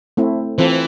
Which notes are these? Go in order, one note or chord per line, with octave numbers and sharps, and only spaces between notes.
A3 C4 E4
E3 C4 F4 A4 C5